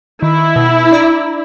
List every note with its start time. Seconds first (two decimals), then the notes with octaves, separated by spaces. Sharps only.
0.22 D#3 E4
0.56 B2
0.91 D4 D5 A#5